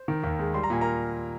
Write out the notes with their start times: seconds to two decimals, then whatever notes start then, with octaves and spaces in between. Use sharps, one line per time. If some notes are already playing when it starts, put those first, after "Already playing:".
Already playing: C5
0.08 D#3
0.24 D#2
0.39 G#3
0.54 G3 C6
0.63 A#5
0.70 A#2 G#5
0.81 A#4 A#5